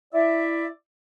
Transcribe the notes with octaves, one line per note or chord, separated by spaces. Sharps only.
E4 D5 E5